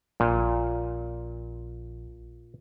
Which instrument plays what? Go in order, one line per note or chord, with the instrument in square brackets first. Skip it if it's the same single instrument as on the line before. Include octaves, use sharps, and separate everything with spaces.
[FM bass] A#1 [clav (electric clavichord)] A#2